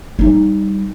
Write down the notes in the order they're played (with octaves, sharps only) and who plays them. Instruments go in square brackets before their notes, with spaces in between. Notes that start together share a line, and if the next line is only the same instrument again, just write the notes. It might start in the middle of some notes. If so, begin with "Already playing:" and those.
[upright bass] G3 D#4